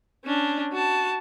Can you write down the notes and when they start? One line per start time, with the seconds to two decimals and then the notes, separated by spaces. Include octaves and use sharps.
0.25 C#4 D4
0.72 F#4 A5